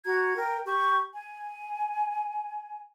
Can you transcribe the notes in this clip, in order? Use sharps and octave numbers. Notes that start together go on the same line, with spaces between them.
F#4 A#5 G#6
A#4 G5
G4 C#6
G#5